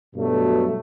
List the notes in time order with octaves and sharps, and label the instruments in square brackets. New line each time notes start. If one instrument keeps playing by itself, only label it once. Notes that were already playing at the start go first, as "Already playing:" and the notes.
[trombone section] G2 B2 F#3 A3